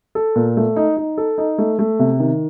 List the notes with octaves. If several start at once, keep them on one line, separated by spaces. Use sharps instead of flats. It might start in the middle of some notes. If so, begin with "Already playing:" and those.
A4
A#2
A3
D#4
D#4
A4
D#4
A3
A3
C3
D#3